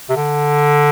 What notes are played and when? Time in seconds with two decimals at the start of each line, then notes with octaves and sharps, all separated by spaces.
0.09 C3
0.16 D3